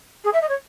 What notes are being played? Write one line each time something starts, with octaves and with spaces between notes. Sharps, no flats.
G#4
E5
D#5
C#5